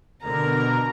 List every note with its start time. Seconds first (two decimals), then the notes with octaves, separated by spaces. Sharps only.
0.23 B2 D3 A#4 A#5